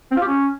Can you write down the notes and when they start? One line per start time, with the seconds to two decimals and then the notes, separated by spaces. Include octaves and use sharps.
0.11 C4
0.17 F4
0.22 G4
0.27 C#4